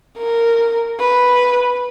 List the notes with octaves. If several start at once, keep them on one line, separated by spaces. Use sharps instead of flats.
A#4
B4